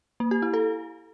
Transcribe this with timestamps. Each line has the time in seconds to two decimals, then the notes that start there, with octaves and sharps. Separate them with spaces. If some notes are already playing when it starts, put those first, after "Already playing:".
0.20 A#3
0.31 G4
0.42 E4
0.54 A4